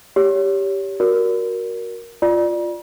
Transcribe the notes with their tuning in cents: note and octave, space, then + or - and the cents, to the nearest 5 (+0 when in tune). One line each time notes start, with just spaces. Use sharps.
G4 +0 C#5 +20
F#4 +0 A#4 +5 D5 -35
F4 +0 D5 +15